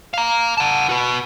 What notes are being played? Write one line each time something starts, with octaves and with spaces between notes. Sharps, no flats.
F5 A#5
F#5 A5
F#4 B4